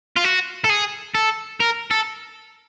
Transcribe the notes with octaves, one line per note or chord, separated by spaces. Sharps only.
F4
F#4
A4
G#4
A4
A#4
A4